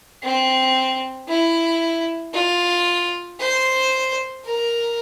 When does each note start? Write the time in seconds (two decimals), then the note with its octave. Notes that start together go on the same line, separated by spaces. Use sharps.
0.23 C4
1.28 E4
2.33 F4
3.40 C5
4.45 A#4